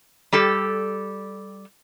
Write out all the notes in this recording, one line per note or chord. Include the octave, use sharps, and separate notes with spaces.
G3 G4 A4